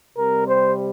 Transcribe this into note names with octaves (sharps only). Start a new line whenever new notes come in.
C3 G3 C4 A#4
C5